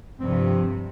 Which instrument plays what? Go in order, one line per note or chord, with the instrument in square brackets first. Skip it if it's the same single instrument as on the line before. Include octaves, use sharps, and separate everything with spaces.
[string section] G2 C3 [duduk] F3 [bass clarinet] C4